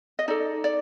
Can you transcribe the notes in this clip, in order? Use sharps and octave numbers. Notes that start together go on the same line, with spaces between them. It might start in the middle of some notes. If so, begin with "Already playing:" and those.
D#5
D#4 A4 D5
D5